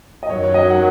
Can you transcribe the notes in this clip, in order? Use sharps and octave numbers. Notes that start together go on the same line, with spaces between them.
D#5
F#2 D#3 F#3 C#5
C#5
D#5
F#5